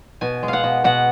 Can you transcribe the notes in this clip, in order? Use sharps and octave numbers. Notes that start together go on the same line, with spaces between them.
B2 G#5
G#3
F5 F#5
B2
B2 F#5